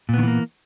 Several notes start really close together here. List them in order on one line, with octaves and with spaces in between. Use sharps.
A#2 B3 D#3 E3 A#3